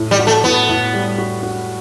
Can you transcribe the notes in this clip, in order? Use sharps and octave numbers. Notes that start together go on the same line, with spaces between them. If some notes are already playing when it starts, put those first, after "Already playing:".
Already playing: A2
G3
F#4
A3
A2 B3
A2
G3
F#4
F#4